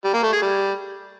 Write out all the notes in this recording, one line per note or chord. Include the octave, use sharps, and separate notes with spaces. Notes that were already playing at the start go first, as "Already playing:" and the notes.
G3
A#3
A3
G#4
G3